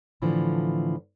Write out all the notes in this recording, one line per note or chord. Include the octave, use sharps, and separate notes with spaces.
A2 D3 E3 F3